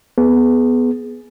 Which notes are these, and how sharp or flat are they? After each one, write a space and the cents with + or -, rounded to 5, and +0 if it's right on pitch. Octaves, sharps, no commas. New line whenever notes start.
B3 +0 G#4 +15